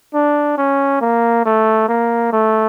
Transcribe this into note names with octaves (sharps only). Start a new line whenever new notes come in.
D4
C#4
A#3
A3
A#3
A3